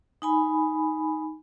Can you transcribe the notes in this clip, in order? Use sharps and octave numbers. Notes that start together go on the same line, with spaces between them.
D#4 G#5 B5